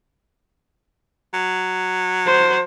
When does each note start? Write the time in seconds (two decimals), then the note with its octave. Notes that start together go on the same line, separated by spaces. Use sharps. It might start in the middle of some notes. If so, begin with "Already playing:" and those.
1.34 F#3
2.26 C5